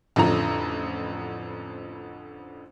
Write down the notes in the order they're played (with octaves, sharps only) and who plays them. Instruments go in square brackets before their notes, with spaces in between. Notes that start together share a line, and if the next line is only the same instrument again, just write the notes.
[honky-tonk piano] A1 F2 D3 F3 A#5